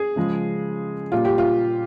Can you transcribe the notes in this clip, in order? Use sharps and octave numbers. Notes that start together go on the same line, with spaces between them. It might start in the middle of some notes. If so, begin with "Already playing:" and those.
Already playing: G#4
C#3 F3 G#3
A#2 G3 F4
G4
F4